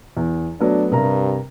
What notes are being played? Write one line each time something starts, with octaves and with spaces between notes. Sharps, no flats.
E2
F#3 A3 B3 D4
G2 C3 A#4 A#5